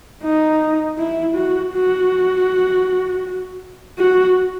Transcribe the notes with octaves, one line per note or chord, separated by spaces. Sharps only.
D#4
E4
F#4
F#4
F#4